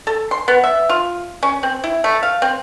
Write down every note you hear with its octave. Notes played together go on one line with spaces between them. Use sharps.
A4
C6
B3
E5
F4
C#4
C4
E4
A3
F5
C4